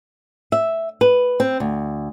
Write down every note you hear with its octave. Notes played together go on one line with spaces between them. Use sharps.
E5
B4
C4
D2